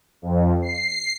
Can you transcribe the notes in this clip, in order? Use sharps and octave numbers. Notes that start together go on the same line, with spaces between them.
F2
C7